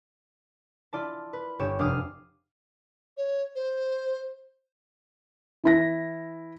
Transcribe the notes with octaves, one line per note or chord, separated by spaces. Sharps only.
E4 F4 D5 A5
B4
G1 G4 C#5 E7
F1 D4 F5 D6 D#6 F6
C#5
C5
E3 E4 A#6